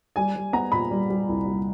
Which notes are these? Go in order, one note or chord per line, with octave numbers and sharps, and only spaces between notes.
G3 G#5
G3
B3 A#5
A#2 B5
G3
G3
C2
G3